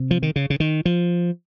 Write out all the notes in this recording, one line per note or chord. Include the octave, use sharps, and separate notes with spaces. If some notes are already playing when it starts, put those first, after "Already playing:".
Already playing: C3
F3
D#3
C#3
C#3
D#3
F3